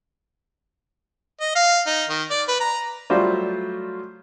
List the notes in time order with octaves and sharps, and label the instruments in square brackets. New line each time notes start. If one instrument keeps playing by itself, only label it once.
[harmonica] D#5
F5
D#4
D#3
D5
B4
A#5
[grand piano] F#3 G3 A3 F4 C5 D5